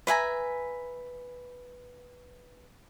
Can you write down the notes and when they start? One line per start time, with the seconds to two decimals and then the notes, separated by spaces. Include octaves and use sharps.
0.07 B4 E5 G#5 A#5